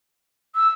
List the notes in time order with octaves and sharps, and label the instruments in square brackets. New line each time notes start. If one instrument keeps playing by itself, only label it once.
[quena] E6